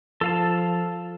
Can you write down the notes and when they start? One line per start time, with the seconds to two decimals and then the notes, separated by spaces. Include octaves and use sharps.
0.21 F3 A4 F5 A5